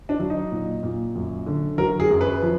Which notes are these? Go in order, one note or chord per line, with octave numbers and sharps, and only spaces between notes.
D4
F#3
D#4
A#2
A#2
F#2
D3
F#3 A#4
G#4
F#2
B4
F3